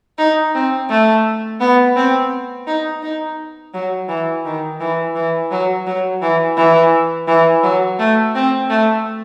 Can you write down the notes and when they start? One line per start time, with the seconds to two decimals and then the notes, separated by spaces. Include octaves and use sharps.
0.18 D#4
0.55 C4
0.90 A3
1.60 B3
1.96 C4
2.67 D#4
3.03 D#4
3.74 F#3
4.08 E3
4.45 D#3
4.80 E3
5.15 E3
5.51 F#3
5.87 F#3
6.22 E3
6.57 E3
7.28 E3
7.63 F#3
7.99 A3
8.35 C4
8.70 A3